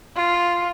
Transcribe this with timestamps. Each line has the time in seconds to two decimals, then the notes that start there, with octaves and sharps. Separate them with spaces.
0.16 F4